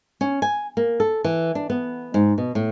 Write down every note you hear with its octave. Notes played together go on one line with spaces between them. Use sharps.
C#4
G#5
A#3
A4
E3
D4
B3
G#2
B2
A2